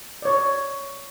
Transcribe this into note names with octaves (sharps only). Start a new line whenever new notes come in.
C#5 D5